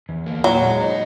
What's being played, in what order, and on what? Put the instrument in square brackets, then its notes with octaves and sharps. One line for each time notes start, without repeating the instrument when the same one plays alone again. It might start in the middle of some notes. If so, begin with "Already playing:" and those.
[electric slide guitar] E2
A#3
[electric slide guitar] A#2 [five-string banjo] F#3
[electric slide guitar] G#3
D#4